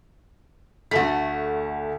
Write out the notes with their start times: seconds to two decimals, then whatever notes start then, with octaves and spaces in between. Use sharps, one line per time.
0.91 D2 A3 F#4 A5 B6